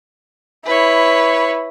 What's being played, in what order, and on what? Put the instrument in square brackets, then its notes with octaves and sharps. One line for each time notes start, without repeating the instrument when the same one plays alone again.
[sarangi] E4 [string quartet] B4 C#5